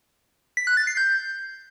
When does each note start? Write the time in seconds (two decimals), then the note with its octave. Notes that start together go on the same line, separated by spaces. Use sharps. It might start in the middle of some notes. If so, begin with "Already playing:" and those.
0.57 B6
0.67 F#6
0.77 A6
0.87 C7
0.97 G6